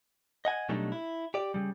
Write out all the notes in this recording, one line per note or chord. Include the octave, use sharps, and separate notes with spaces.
D#5 F#5 G#5
B2 F#3 G3 A3 D4 D#4
E4
G4 D5
C#3 G3